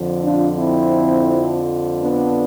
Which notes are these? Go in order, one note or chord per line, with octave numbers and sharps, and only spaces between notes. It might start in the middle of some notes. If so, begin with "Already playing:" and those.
Already playing: F2 D3 F3
D4 F4
C4 E4
B3 D4